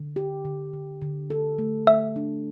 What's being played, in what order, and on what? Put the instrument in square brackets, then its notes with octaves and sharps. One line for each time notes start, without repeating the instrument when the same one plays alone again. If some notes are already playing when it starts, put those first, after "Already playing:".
Already playing: [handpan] D3
G4
D3
D3
D3
A4
A3
[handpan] A3 [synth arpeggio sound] E5
[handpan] D4